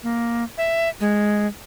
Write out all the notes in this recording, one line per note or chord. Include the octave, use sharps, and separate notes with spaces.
A#3
E5
G#3